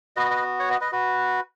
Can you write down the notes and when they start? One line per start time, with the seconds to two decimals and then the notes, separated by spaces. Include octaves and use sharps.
0.16 B3 F#4 B4 D#5
0.31 B4 D#5
0.59 C#5 F#5
0.70 B4 D#5
0.81 B4 D#5
0.92 F#4 B4